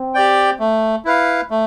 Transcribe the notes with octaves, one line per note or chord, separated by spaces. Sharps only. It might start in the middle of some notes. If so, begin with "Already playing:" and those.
Already playing: C4
G4 D5 G5
A3
E4 B4 F5
A3